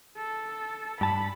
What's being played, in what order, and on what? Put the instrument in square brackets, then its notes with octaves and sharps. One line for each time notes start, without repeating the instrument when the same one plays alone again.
[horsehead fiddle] A4
[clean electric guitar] G2 A5 [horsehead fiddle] B5